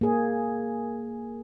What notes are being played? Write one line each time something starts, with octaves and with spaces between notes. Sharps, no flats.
A#3 G#4